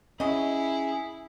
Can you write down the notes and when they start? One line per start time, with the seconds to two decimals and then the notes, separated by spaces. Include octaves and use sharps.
0.20 F#3 C#4 E4 G#4 D#5